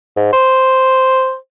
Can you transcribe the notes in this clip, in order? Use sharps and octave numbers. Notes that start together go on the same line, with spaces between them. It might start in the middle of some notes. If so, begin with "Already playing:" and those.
G#2
C5